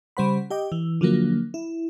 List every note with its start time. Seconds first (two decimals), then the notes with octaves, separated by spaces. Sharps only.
0.17 C#3 G3 C5 F#5 B5
0.50 G4 D#5 G5 D6
0.72 E3
1.01 D3 F3 F#3 A#3
1.54 E4